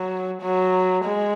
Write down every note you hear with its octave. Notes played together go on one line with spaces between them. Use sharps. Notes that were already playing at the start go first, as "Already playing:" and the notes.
Already playing: F#3
F#3
G#3